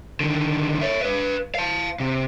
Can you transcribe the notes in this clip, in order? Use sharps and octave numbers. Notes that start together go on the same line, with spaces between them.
D3 D#3
C#5 E5
B4 F5
F5 A5
C3